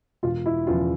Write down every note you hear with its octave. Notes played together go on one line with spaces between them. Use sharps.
E1 F4
E4
E2 C#3 F3 F4